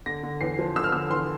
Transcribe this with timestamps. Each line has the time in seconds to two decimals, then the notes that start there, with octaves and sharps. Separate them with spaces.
0.06 D3 A#6
0.23 D3
0.41 E2 C7
0.59 F3
0.75 D3 E6
0.84 F6
0.92 D3 E6
1.10 E2 C6